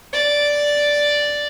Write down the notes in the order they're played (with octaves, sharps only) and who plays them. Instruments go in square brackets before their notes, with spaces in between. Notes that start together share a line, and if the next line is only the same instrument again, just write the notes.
[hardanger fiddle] D5